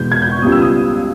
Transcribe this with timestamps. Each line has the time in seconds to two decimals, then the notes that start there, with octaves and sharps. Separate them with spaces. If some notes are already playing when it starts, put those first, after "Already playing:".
Already playing: E2 B2 G#3 B3 G6
0.12 G#6
0.22 G6
0.32 C#6
0.42 C#2 C#3 G3 B3 D#6
0.52 E6
0.62 D#6